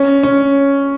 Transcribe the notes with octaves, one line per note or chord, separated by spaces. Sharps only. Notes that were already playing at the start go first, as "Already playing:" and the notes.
Already playing: C#4
C#4